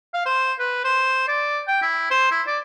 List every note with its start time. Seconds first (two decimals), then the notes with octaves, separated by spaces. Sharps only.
0.14 F5
0.26 C5
0.59 B4
0.85 C5
1.28 D5
1.68 G5
1.82 E4
2.11 C5
2.31 E4
2.47 D5